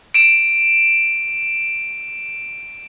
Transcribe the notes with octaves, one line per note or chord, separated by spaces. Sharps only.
D7 E7